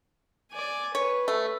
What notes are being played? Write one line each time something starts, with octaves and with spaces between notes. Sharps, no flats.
D5 G#5
B4 C#5
A3